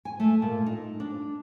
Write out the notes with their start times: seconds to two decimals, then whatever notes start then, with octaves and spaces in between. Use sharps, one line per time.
0.05 G#5
0.20 A3
0.42 A#2
0.66 D#4
1.00 D4